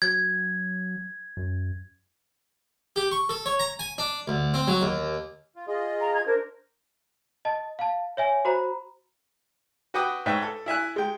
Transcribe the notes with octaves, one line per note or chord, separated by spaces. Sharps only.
F#3 G#6
F#2
G4
C#6
A4
C#5
A#5
G#5
D4
D2
C4
F#3
D#2
F4
F4 G#4 D#5
A#5
G#6
D4 A#4 C5
D#5 A5
F5 A5
C#5 E5 G#5
F#4 C5 A#5 B5
F#4 B4 F#5 G5 D6 D#6
G#2 D#4 B4 C#5 E5 G5
A4
E4 E5 G#5 F#6
G#3 G5